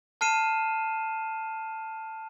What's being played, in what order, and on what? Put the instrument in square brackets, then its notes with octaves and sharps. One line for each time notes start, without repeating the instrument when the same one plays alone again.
[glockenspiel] A5 F6 C7 D#7 E7